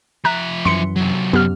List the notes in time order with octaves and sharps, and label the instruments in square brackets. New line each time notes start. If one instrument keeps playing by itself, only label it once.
[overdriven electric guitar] F3 E5 [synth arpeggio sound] A#5 F#6
[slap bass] F#2 E3 [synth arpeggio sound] C6 C#7
[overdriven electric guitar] C3 F#3
[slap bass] F#2 [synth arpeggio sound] B3 G4 F6